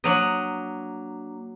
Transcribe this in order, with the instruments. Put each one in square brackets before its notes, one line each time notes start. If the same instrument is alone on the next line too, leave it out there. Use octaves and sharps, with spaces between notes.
[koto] F#3 D#5 [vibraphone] A#3 D4